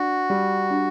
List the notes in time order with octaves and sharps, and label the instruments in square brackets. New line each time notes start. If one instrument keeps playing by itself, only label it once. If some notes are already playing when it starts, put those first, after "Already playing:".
Already playing: [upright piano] D4 [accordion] F#4
[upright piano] G3
D4